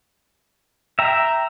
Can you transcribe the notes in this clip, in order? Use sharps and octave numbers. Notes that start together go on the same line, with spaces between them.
E5 G5 A#5